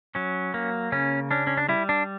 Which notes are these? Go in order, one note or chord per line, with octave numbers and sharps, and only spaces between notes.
F#3 C#4
A#3
C#3 C#4
C#4 D4
C#4
D4
G3 E4
D4